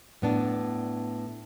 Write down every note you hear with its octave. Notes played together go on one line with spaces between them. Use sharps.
A2 B3 D4